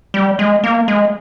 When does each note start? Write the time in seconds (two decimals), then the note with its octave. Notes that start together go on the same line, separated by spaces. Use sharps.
0.14 G3
0.39 G#3
0.64 A#3
0.88 G#3